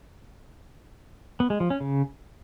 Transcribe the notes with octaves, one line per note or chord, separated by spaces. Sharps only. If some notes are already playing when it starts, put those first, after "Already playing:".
B3
G#3
F3
C#4
C#3